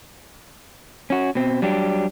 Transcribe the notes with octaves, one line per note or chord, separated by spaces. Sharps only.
C#4 F#4
B2 C4
F#3 G3 D4 G4